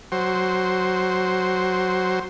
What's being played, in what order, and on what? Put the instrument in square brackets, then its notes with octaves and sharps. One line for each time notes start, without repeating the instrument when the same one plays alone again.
[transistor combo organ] F#3 C5